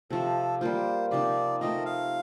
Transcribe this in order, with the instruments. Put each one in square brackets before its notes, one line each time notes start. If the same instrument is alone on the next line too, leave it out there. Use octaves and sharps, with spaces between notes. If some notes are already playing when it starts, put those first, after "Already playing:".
[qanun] C3 F3 C4 [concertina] A4
[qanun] G3 A#3 F4 [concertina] C5
[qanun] C3 F3 C4 D#4 [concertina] D5
[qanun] A3 C4 F4 A#4 [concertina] D#5
[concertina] F5